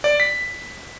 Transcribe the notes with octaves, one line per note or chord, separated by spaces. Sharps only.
D5
B6